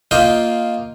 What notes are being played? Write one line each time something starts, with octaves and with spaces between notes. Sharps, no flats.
A#3 F4 D#5 G5